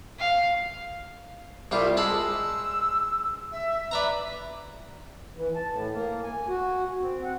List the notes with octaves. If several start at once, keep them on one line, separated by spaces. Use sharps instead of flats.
F5
C2 G3 F4 E5
G#3 A5 B5 E6
E5
B4 D5 E5 A#5
E3
A5
A2
A#3
G#5
F#4
C4
F#5